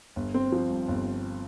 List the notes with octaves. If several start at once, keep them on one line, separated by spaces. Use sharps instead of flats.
G1
C4
F3
G2
G1